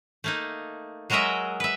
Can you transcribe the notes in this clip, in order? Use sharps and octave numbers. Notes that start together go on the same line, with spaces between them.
A3 A#3 D#4
F#3 G#3 F#4 A#4 D#5 E5
B4 E5